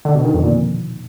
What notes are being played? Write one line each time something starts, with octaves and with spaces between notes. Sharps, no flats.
D3
B2
D#3
F2
A#2